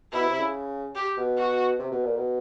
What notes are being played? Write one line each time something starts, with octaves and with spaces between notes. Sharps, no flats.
B2 E4
C3
C#3
G4
B2
F#4
C3
B2
A#2
B2